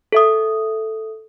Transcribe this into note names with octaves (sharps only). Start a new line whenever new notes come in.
A4 E5 D#6